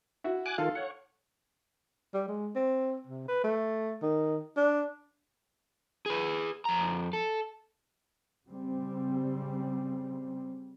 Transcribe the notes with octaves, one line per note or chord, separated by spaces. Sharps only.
E4 F#4
G#5 D6 F#6
D#3 F4 A4 F5
C#5 F#5
G3
G#3
C4
C3
B4
A3
D#3
D4
G#4 B4
F2 A#5
A4
C#3 G3 C4